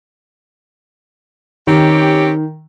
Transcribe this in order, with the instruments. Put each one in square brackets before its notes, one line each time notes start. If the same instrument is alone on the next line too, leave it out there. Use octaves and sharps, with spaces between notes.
[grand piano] D#3 [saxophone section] C4 C#4 G4